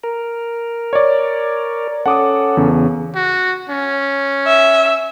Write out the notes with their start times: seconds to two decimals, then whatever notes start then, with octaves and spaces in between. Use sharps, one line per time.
0.04 A#4
0.93 C#5 D5
2.06 C#4 A4 F#5 D6 D#6
2.57 E2 C#3
3.15 F#4
3.69 C#4
4.47 E5